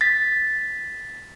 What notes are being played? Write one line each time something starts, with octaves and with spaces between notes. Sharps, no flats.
A6 B6